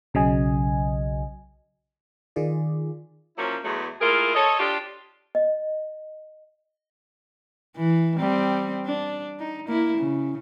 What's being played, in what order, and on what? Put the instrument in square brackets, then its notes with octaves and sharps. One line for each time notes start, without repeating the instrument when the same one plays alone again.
[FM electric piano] B1 C#3 F#3 D#5 G#5
D#3 F4 G#4 D5
[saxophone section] F3 F#3 A#3 C#4 E4
E2 F#3 G#3 A3
A3 A#3 E4 F4 G#4 A#4
A4 C#5 D#5
D4 F4 G4
[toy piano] D#5
[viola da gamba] E3
G3 C4
D4
D#4
A#3 E4
C#3